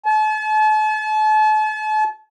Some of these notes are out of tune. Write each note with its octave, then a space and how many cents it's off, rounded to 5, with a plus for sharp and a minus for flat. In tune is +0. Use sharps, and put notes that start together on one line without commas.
A5 -40